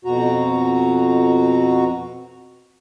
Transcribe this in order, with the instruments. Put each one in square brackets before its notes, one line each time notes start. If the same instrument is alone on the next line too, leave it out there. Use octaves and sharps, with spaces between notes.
[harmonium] F2 B2 F#4 A#5